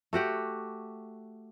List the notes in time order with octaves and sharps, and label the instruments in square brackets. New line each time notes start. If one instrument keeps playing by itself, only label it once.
[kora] A3 F#4 G4 F#5